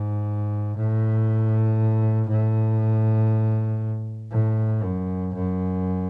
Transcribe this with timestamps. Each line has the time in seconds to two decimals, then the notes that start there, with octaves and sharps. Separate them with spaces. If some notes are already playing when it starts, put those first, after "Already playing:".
Already playing: G#2
0.77 A2
2.29 A2
4.31 A2
4.83 F#2
5.34 F#2